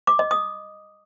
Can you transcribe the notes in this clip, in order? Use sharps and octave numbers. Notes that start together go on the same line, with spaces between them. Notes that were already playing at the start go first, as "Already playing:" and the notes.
D6
D#5
D#6